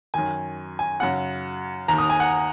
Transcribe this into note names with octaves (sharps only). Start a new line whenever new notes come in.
F#2 D#3 G#5
G#5
F#2 C#3 F#5
D#2 D#3 A#5
D#6
G#5
F#5